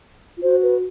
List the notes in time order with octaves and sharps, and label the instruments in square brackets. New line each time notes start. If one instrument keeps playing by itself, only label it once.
[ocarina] F4
[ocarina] F#4 [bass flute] C5
[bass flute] B4